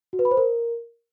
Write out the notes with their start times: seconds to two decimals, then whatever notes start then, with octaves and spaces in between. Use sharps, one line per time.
0.13 F#4
0.19 B4
0.25 B5
0.31 C5
0.37 A#4